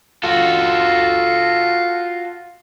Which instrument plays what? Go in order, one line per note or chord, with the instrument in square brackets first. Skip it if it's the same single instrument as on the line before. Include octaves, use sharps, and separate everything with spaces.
[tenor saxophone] F4 [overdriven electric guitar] F#4 A4